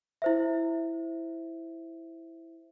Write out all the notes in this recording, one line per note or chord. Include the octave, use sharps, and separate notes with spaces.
E4 C5 E5